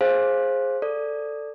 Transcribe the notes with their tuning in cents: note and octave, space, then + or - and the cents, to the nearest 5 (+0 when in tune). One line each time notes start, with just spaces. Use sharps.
G#4 +0 C5 +20 F5 +0
A4 +10 D5 +0